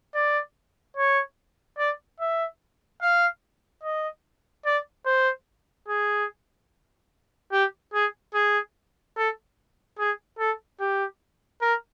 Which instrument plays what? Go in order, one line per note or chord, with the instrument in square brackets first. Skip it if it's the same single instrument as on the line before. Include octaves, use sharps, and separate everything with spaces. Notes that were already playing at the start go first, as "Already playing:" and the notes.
[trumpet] D5
C#5
D5
E5
F5
D#5
D5
C5
G#4
G4
G#4
G#4
A4
G#4
A4
G4
A#4